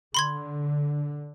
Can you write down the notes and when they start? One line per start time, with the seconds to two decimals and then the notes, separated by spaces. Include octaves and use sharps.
0.14 D3 B5 C6 G#6